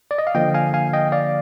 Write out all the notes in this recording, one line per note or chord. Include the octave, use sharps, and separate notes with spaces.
D5
D#5
F5
D3 F3 A#3 D#5 G5
F5 G#5
F5 G#5
D#5 G5
D5 F5